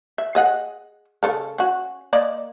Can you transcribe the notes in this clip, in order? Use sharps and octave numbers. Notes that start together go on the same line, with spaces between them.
E5
G#4 D#5 F#5
C#3 A4 A#4
C#4 F#4
A#3 D5 D#5